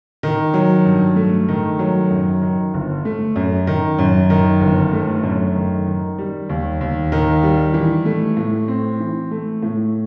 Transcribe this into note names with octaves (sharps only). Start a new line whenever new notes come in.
D#3
F#3
G2
A3
D#3
F#3
F#2
D#3
G1
A3
F#2
D#3
F#2
D#3
G1
A3
F#2
D#3
D#3
G3
D#2
D#2
D#3
G3
E3
A3
A2
C4
E3
A3
A2